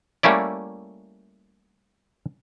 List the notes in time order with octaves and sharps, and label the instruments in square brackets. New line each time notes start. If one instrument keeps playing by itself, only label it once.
[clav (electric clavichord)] G3 A3 A#3 C#4 E4 D5